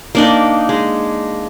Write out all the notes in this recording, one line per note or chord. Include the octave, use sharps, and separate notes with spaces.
A#3 D4 D#4
G#3